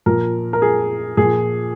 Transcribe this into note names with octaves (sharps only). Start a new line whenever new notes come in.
A#2 F3 A#4
A#4
G#4
A#2 F3 G#4